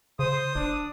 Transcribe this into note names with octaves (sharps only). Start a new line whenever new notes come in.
C#3 C5 D#6
F#1 D4